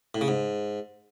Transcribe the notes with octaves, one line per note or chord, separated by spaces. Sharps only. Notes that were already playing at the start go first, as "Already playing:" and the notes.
A2
C#3
G#2